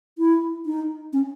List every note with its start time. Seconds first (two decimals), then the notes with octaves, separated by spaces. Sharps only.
0.18 E4
0.66 D#4
1.13 C#4